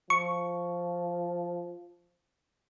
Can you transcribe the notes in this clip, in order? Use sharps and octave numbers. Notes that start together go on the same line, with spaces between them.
F3 C#6